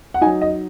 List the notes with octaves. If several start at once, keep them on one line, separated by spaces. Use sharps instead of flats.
F#5
F#3 D#4 G#5
D#5